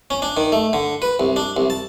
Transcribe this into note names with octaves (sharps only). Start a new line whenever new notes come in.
C#4
D4
D#3
A3
D3
B4
C2
D4
C2
A5